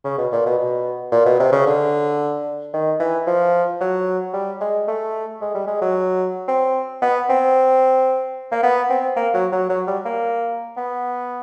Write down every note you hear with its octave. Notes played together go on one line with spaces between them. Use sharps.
C#3
B2
A#2
B2
B2
A#2
B2
C3
C#3
D3
D#3
E3
F3
F#3
G3
G#3
A3
G#3
G3
G#3
F#3
C4
B3
C4
A#3
B3
C4
A#3
F#3
F#3
F#3
G3
A#3
B3